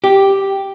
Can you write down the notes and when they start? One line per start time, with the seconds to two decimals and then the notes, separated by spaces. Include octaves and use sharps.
0.04 G4